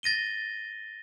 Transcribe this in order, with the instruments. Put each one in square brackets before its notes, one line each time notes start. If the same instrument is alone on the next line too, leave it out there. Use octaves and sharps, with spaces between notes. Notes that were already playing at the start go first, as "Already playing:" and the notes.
[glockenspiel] A6 A#6 D#7 G7